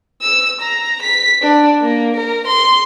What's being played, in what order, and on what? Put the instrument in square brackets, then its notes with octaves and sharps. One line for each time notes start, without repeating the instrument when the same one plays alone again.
[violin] E6
A#5
B6
D4
A#3
A#4
C6